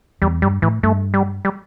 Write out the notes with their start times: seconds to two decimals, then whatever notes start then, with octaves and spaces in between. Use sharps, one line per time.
0.22 E2 G3
0.42 G2 G3
0.62 A2 E3
0.83 G2 A3
1.14 G3
1.45 G3